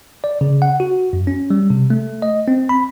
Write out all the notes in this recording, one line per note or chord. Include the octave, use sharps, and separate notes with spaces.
D5
C#3
F#5
F#4
F#2
C#4
G3
C3
A3
D#5
C4
B5